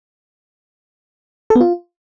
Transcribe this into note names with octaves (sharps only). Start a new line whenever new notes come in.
A4
B3
F4